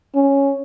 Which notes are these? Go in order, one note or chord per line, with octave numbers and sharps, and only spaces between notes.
C#4